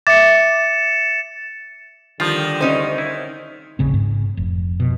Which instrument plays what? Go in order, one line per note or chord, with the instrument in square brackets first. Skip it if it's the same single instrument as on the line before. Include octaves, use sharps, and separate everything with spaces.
[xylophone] E5 D6 [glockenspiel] A6 [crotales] C#7 E7
[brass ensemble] D3 G3 [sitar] D#3 [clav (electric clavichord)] F3 F4
[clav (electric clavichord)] D2 [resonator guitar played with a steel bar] C#4 D#4 C5
[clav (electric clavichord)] E4
[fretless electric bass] D#1 A1 C#3 C4
G#2
F1
F2 B2